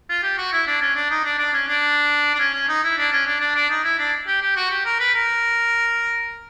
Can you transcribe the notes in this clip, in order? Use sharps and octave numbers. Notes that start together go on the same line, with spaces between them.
F4
G4
F#4
E4
D4
C#4
D4
D#4
D4
D4
C#4
D4
D4
C#4
C#4
D#4
E4
D4
C#4
D4
D4
D4
D#4
E4
D4
G4
G4
F#4
G4
A#4
B4
A#4